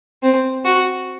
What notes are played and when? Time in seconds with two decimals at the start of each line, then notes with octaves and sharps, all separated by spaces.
0.23 C4
0.65 F#4